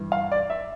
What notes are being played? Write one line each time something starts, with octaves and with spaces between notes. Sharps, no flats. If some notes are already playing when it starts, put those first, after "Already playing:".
Already playing: G2 E3
F5
D5
E5